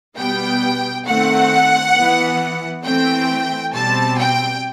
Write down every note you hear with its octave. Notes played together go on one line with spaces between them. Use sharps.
B2 G3 B3 G5
D#3 A3 C4 F#5
E3 B3
E3 A3 C4 G5
B2 G3 C4 A5
G5